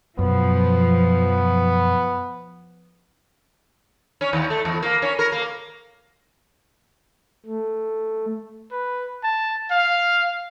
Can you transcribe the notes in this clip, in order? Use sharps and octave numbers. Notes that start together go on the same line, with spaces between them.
F#2 B2 F3 B3
C#4
D#2
A3
E2
A#3
C#4
A#4
A#3
A3
B4
A5
F5